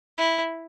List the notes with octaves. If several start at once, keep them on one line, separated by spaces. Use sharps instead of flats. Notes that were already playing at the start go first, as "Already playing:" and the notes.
E4